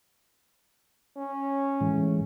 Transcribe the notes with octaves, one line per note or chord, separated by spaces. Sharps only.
C#4
A2 E3 G#3